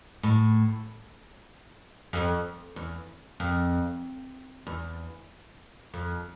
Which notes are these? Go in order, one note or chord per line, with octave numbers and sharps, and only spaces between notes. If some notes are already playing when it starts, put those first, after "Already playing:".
A2
F2
E2
F2
E2
F2